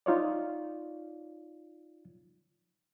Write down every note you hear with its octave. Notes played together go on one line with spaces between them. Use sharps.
D#4 F4 C#5 D5